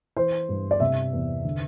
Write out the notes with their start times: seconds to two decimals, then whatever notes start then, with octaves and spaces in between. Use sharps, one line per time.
0.16 E3 C5
0.49 G2
0.71 D5
0.80 C3 E5
1.13 E2
1.44 D3